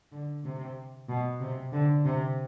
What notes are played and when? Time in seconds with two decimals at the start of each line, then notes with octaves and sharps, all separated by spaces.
0.12 D3
0.44 C3
1.09 B2
1.41 C3
1.73 D3
2.05 C3